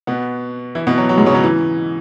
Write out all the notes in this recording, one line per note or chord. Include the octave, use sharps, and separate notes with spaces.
B2 B3
E3 E4
B2 B3
F#3
F#3
G#2 G#3
C#3 C#4
F#3
E3